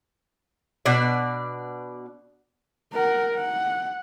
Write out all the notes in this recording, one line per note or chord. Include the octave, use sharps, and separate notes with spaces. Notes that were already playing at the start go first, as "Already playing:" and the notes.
B2 D4 D5
A#4 F#5
F#5